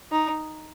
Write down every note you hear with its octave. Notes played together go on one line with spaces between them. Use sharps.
D#4